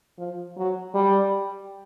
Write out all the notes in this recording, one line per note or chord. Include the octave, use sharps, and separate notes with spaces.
F3
F#3
G3